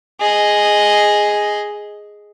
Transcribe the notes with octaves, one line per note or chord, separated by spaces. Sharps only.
G#4 D#5